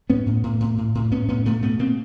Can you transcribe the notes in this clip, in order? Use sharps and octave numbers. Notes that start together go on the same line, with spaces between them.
A2 B3 C#4
A2
A2
A2
A2
A2
A2 B3 C#4
A2 B3 C#4
A2 A3 B3
B2 A3 B3
B2 A#3 C4